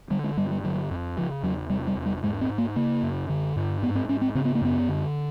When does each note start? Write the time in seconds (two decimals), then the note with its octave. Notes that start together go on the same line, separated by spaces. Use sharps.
0.10 D3 G3
0.24 G#3
0.37 G2 G3
0.51 G3
0.64 D3 F#3
0.91 F2
1.17 C#3 F3
1.43 E2 F#3
1.70 C3 G3
1.87 G3
1.97 E2
2.06 G3
2.23 G#2 G#3
2.41 C4
2.49 G#2
2.58 A#3
2.76 C#3 A#3
3.03 F#2
3.29 D3
3.56 G2
3.82 G#2 B3
3.95 C4
4.09 G#2 C#4
4.21 C4
4.35 C#3 C4
4.45 B3
4.55 A#3
4.62 F#2 B3
4.88 D3